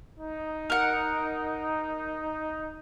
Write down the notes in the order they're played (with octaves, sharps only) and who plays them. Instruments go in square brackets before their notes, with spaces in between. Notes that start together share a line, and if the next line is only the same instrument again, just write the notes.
[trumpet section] D#4
[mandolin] A#4 F#5